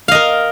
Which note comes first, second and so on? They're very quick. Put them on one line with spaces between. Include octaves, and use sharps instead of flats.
F5 D#5 A#4